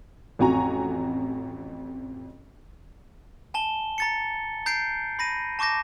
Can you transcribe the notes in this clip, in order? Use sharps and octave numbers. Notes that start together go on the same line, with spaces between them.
A1 F2 F#4 G#5 A#5
G#5 A5 G7
A#5 A6 C#7
A#5 G6 C7 D7
B5 A#6 D#7
A5 C#6 D6 G6 A#6